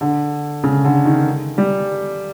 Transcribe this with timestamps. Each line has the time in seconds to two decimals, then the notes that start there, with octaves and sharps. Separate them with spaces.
0.01 D3
0.64 C#3
0.84 D3
1.05 D#3
1.58 G3